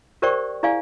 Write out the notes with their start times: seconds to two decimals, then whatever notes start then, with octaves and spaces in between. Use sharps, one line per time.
0.22 G4 A#4 C5 D5 G5 C#6
0.63 E4 G#4 D5 F5 G#5